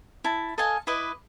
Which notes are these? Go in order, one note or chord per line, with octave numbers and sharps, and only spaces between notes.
E4 A5
A4 D#5 F5 G#5
E4 B4 D#5 D6